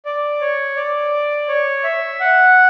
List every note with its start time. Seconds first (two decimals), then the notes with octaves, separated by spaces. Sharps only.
0.05 D5
0.41 C#5
0.76 D5
1.48 C#5
1.84 E5
2.20 F#5